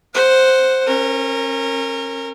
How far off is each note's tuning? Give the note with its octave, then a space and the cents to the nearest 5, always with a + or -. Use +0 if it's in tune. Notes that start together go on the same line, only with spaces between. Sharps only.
C5 +0 F#5 +0
C#4 -35 A#4 -20